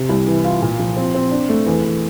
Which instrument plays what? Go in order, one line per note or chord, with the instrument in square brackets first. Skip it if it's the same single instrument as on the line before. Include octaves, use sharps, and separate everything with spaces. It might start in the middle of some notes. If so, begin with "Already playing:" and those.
Already playing: [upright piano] C3
C2
E3
F4
A#2
F3
C4
C4
D4
A3
E2
E2